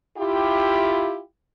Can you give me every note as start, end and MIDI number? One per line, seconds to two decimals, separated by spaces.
0.18 1.19 64
0.18 1.19 65
0.18 1.19 67